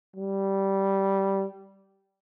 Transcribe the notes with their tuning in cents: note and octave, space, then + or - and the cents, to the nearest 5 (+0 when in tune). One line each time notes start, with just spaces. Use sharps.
G3 -10